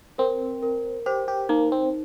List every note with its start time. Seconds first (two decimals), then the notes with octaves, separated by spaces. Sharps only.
0.18 C4 A#4
0.63 A#4
1.06 G4 C5
1.28 G4
1.49 A#3 D#4
1.72 C4